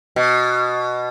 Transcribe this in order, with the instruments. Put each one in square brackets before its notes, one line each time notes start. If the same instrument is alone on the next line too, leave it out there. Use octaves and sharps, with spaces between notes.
[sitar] B2